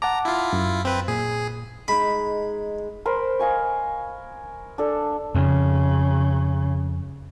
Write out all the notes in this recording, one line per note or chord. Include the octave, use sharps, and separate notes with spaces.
F#5 A5 A#5 D6
E4 F4
F#2
C4 B4
A#2 G#4
G#3 D#4 B5
A#4 C5 B5
D#5 F5 G#5 C#6
D4 A4
F2 C#3